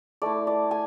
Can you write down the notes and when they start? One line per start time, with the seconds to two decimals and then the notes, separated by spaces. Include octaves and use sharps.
0.22 A3 E4 D5
0.47 D5
0.71 G#5